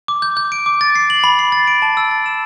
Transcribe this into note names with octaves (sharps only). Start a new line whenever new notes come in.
D6
G6
G6
D7
D6
A6
C7
F#7
B5
C7
A6
D7
A5
E6
A6
E7